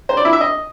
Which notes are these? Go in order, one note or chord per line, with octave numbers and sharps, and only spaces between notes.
C5
D5
E4
E5
D#5